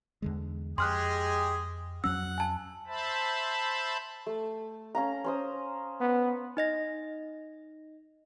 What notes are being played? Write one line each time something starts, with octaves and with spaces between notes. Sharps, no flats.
E2 D3 G#3
F2 G#3 G4 G#4 C6 F6 F#6
F2 F#3 C#4 F#5 E6
G#5 A5
C5 E5 A5 B5
A3
C#4 F5 A#5
C#4 C5 D#6
B3
D#4 D#5 A#6